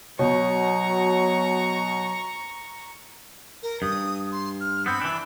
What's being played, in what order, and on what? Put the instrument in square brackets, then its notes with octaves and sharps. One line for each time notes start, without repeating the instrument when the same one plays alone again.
[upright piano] B2 [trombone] F#3 [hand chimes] C#5 [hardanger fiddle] A#5 C#6
[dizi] A#4
[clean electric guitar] G2 [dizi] D#6
[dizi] C6
F6
[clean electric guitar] B3 C4 [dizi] B5
[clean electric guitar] E3 D4